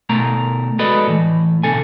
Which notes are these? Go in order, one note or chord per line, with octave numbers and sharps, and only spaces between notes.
B2 A3 A#4 A#5
G#3 F#4 A4 B4 D5 D#5
A2 E3
B2 D3 A4 G#5